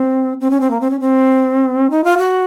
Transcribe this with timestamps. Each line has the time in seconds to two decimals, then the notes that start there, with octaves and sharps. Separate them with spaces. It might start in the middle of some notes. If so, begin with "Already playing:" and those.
Already playing: C4
0.41 C4
0.50 C#4
0.60 C4
0.70 A#3
0.81 C4
0.90 C#4
1.00 C4
1.90 D#4
2.04 F4
2.18 F#4